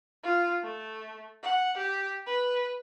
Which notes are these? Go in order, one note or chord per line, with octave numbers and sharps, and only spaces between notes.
F4
A3
F#5
G4
B4